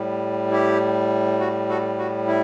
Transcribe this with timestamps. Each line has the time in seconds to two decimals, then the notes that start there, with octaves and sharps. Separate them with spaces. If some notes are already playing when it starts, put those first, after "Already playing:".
Already playing: A2 G3
0.51 E4 G4
1.40 F#4
1.69 F#4 A4
1.99 F#4
2.27 E4